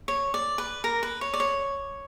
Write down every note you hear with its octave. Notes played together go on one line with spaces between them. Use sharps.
C#5
D5
B4
A#4
B4
C#5
D5
C#5